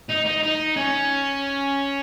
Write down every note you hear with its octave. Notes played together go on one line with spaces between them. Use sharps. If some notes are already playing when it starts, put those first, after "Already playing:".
D#4
D#4
D#4
C#4